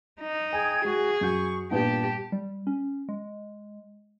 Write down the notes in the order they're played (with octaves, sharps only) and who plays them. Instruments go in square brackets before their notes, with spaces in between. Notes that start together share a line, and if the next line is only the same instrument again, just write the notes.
[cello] D#4
[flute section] G#4 G5 G#6 [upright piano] G#5
[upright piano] G#3 [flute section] F#4 [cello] G#4
[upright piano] F#2 F#4 G6 [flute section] C#6
[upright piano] G2 A#2 B3 [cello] G4 [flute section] A5
[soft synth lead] G3
C#4
G#3